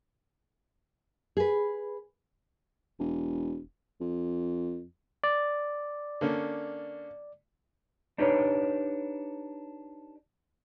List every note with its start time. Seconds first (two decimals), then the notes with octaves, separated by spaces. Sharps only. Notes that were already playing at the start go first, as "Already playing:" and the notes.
1.37 G#4 B4
2.99 E1
4.01 F2
5.24 D5
6.21 D3 A#3 C#4
8.18 D4 D#4 G4 B4 C#5